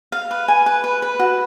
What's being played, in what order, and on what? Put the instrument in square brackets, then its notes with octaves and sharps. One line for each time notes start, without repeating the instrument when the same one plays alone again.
[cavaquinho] F5
B4
G#5
B4
B4
B4
F#4